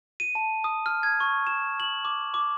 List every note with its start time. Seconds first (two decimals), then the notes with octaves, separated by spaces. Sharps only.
0.20 D#7
0.35 A5
0.64 D#6
0.86 F6
1.03 G#6
1.20 C#6
1.47 E7
1.80 F#7
2.05 D6
2.34 D6